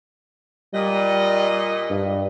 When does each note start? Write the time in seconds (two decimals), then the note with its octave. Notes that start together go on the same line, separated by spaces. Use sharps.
0.73 A#2 G3 D#5
1.90 G2